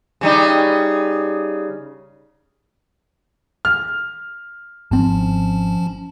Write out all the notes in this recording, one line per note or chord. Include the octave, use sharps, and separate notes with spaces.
C#3 G3 D#4
F6
G#1 F3 C4 C#4 A5